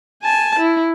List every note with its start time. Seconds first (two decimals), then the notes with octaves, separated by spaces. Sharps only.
0.23 G#5 A5
0.59 E4